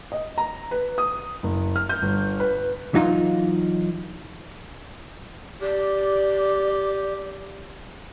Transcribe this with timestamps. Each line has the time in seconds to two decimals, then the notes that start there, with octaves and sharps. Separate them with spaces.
0.12 D#5
0.38 A#5
0.71 B4
0.98 D#6
1.43 F#1
1.76 F6
1.89 G6
2.02 G1
2.40 B4
2.94 E3 F#3 D#4 F4
5.62 G4 D5